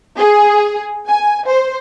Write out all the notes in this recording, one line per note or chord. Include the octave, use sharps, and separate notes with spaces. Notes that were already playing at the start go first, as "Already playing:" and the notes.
G#4
G#5
C5